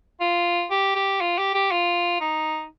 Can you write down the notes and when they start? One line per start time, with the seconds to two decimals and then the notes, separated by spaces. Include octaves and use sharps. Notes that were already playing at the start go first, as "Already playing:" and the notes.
0.21 F4
0.71 G4
0.95 G4
1.21 F4
1.38 G4
1.55 G4
1.71 F4
2.21 D#4